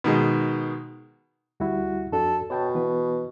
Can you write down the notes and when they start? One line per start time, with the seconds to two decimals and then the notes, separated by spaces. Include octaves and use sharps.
0.04 B2 D#3 G#3
1.60 D2 G3 E4 F#4
2.12 F2 D4 F#4 A4
2.50 B2 C#5 G5 A5
2.75 E3 B3 B4